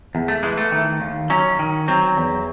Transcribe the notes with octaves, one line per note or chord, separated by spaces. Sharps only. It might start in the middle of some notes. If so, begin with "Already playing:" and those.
E2
A3
E3 G#3
A3
D#3
D#2
F#3 C#4
D#3
F#3 C4
E2